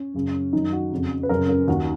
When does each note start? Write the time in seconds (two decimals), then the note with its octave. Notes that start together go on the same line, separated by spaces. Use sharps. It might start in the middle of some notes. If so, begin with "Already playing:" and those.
Already playing: C#4
0.14 F#2 C#3
0.53 F#2 D#3 D#4
0.72 F#4
0.92 F2 C#3
1.23 B4
1.29 F#2 C#3 A#4
1.49 A#4
1.68 D#2 D#3 F#4